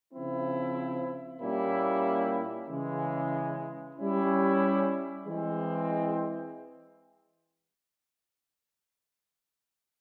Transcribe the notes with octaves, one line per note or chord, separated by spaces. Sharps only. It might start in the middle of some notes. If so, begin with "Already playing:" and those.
C#3 F3 C4 E4
A#2 G3 A#3 C#4 E4
C#3 E3 G#3
G3 C#4 E4
E3 G#3 C4